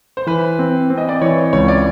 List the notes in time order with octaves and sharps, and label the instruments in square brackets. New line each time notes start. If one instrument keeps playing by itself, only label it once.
[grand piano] C5
[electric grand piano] E3 [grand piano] B4
[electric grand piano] C4
C4
[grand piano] D#5
D5
[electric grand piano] E3 [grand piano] C#5
[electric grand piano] C#2 [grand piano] C#5
[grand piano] D5